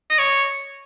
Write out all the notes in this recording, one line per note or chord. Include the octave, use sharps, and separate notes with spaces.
D#5
C#5